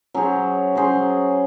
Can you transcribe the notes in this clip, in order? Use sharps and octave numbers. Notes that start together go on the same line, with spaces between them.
F#3 C#4 G#4 C5
F#3 C#4 G#4 C5